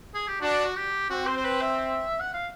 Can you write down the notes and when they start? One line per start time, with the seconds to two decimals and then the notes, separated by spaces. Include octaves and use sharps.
0.14 G#4
0.27 G4
0.41 D4 F#4
0.64 F#4
0.76 G4
1.10 C4 F#4
1.27 C5
1.37 C5
1.44 B4
1.61 E5
2.20 F#5
2.33 F5